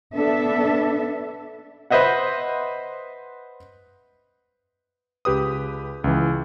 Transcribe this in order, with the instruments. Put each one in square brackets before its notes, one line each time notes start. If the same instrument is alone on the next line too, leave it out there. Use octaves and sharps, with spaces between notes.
[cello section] B3 D4 A4 E5
[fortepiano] B4 C5 D#5 E5 F#5
[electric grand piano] C#2 G4 B4 D#6
C#2 E3